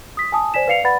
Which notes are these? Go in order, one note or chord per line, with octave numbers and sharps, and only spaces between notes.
D#6 B6
G#5 A5 D#6
C5 D5 G#5 B6 E7
B4 D5 F5 C7 C#7 F7
B4 D5 F#5 B5 A6